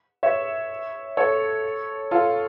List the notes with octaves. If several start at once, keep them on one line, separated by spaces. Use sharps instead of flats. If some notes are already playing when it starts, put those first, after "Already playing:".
C#5 E5
A4 C#5
F4 A4